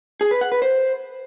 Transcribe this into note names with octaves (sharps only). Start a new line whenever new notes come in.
G#4
B4
F#5
B4
C5